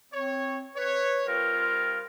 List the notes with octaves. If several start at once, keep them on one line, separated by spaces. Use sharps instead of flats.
C4 C#5
B4 C#5
G3 C4 F4 A#4